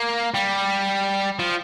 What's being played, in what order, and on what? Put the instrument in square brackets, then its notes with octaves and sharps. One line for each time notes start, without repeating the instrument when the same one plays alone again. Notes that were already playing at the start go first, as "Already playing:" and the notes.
Already playing: [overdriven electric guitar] A#3
G3
F3